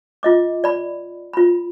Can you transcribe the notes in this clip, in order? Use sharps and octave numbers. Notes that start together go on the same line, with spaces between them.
F4 D#5 D6
D5 B5
F4 B5